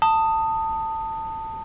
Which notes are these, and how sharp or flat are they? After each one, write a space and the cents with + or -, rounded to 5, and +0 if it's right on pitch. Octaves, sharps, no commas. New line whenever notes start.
A5 +20 D#6 +0